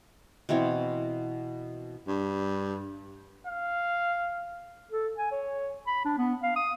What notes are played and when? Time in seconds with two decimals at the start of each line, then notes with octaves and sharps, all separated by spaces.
0.49 B2 E3 C4 C#5
2.07 G2
3.47 F5
4.92 A4
5.18 G#5
5.32 C#5
5.87 B5
6.05 D4
6.18 B3
6.43 F5
6.56 D#6